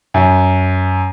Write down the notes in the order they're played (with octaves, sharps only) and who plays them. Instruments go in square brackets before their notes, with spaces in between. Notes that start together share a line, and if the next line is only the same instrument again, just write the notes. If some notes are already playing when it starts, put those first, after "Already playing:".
[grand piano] F#2